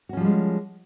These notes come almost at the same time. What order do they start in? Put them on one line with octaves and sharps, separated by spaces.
F#4 C#4 F3 G3 G#3